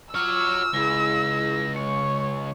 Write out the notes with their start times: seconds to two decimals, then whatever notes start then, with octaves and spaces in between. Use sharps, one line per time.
0.15 F4 F#4 C#5 C#6 D6 E6 F6
0.74 C#2 E4 G#4 A#6
1.76 G#3 C#5 C#6